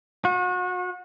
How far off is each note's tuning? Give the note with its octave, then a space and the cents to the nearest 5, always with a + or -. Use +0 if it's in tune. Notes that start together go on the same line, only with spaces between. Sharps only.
F#4 -35